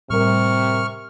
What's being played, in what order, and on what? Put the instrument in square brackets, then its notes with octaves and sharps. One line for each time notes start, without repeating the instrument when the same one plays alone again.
[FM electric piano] A2 G3 A#4 [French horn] C3 [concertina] C#6 F6